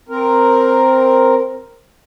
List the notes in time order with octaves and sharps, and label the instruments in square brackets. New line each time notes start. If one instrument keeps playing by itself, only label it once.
[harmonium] C4 A#4